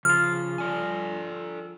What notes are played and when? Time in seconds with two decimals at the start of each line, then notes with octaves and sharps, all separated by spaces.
0.05 C#3 F3 F4 F6
0.58 A4 D5 G#5